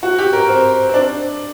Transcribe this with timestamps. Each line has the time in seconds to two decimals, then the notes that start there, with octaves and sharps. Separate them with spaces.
0.03 F#4
0.19 G4
0.33 A#4
0.48 C4
0.89 C4
0.94 D4